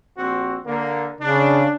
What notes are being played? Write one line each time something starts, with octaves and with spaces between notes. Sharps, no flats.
A#1 C4 F#4
D3 A#3
C#3 D4